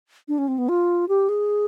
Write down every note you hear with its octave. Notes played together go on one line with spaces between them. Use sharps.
D4
C#4
C4
B3
F4
G4
G#4